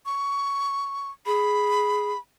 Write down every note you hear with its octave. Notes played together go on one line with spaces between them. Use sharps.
C#6
G#4 B5